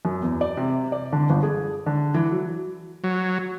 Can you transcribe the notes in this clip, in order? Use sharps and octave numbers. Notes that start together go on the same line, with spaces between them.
F#2
E2
D5
C3
D5
D3
G1
G#4
D3
E3
F#3
F#3